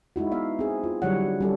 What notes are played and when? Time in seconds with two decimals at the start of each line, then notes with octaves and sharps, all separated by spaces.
0.16 G#3 D#4 E4 F#4
0.31 B3 E5 F5
0.59 C4 G#4
0.84 F4
1.02 D3 F#3 G3 E4 C#5 F#5
1.41 G3 C#4 A4